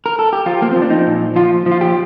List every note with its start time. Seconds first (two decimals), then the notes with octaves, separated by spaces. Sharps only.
0.06 A#4
0.19 A4
0.33 G4
0.46 F3 F4
0.62 A#3
0.71 F3 C4
0.82 D4
0.90 D#4
1.06 A#2
1.36 F3 F4
1.66 F3
1.72 F4
1.81 G4